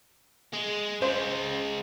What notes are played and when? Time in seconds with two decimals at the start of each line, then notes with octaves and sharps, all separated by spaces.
0.53 G#3
1.02 C#3 G#3 C5